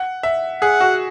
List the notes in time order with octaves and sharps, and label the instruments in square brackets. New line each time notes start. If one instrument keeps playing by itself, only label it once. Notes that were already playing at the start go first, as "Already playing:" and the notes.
Already playing: [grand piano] F#5
E5
[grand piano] G#4 [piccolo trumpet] F#5
[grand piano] F#4